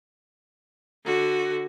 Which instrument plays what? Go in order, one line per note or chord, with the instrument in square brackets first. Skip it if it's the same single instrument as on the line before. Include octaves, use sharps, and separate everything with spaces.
[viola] D3 F#4